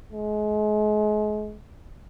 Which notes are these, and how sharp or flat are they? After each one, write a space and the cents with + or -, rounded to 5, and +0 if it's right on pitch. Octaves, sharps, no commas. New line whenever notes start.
G#3 +35